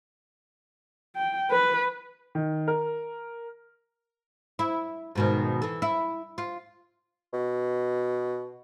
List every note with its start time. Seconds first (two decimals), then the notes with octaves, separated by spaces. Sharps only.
1.16 G5
1.51 B4
2.35 D#3
2.68 A#4
4.59 E4
5.15 G#2 B2 D#3
5.62 E3 A4
5.82 E4
6.38 F4
7.33 B2